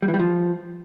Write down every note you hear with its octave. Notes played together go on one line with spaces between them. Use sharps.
G3
E3
G3
F3